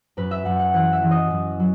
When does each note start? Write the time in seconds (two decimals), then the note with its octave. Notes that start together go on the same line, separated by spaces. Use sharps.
0.17 F#2 B4
0.31 E5
0.45 F#2 F#5
0.59 F#5
0.74 E3 F#5
0.93 E5
1.02 E3
1.11 D#5
1.30 F#2
1.60 F#3